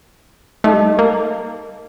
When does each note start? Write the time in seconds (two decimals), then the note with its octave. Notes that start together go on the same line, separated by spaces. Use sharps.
0.64 A3 D#4 A4 D#5 A5
0.73 G3
0.81 A3
0.99 A#3